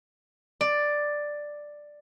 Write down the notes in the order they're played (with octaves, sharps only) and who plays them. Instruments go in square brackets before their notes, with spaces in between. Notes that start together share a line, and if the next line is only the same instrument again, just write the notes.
[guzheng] D5